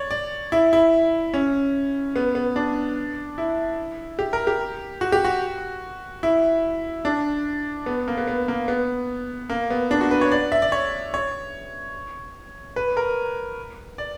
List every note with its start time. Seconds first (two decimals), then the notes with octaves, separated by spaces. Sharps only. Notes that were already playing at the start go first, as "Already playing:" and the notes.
Already playing: C#5 D5
0.11 D5
0.52 E4
0.73 E4
1.34 C#4
2.16 B3
2.35 B3
2.56 D4
3.38 E4
4.19 G4
4.33 A#4
4.47 G4
5.01 F#4
5.12 G4
5.24 F#4
6.23 E4
7.05 D4
7.86 B3
8.08 A#3
8.18 B3
8.28 B3
8.48 A#3
8.68 B3
9.50 A#3
9.70 B3
9.91 D4
10.01 F#4
10.11 B4
10.21 C#5
10.32 D5
10.52 E5
10.62 D5
10.72 C#5
11.14 C#5
12.76 B4
12.97 A#4
13.98 D5